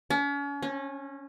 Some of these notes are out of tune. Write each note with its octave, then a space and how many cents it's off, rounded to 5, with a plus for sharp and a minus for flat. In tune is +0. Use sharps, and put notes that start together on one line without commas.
C#4 +40
C#4 -25